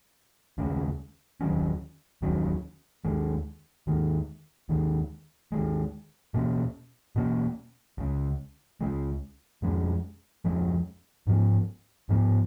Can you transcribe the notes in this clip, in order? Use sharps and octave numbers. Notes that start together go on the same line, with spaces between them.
D#2 C#3 G#3 C#4
D#2 D#3 F#3 C#4
D#2 D#3 F#3 C#4
D#2 D#3 G#3
D#2 D#3 G#3
D#2 D#3 G#3
D#2 D#3 G#3
B2 A#3 C#4
B2 A#3 C#4
C#2 C#3 G#3
C#2 C#3 G#3
F2 F3 G#3 C#4
F2 F3 G#3 C#4
G#2 F3 B3
G#2 F3 B3